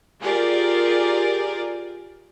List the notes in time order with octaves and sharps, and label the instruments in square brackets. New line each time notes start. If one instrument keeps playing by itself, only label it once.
[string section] F4 G4 G#4 A#4 D5